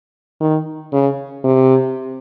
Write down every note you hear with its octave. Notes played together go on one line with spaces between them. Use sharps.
D#3
C#3
C3